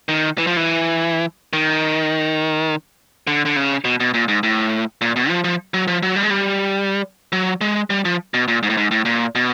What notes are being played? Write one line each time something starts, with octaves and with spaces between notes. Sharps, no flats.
D#3
E3
F3
E3
D#3
D3
D3
C#3
B2
B2
A#2
G#2
A2
A#2
B2
F3
F3
F#3
F3
F#3
G3
G#3
G3
F#3
G#3
G3
F3
B2
A#2
G#2
A2
G#2
A2
A#2
B2